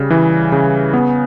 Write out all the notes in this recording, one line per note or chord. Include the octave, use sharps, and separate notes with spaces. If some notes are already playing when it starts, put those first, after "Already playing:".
Already playing: C#3 G3
E3
C#3
B3